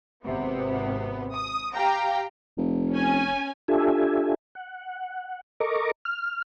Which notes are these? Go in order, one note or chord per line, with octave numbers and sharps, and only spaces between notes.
G#1 C3 B3
D#6
G4 F5 G5 A#5
F1
C#4 G#5
D4 F4 G4 A4 E5 G#5
F#5
A4 A#4 D#5 A#5 C#6 D6
F6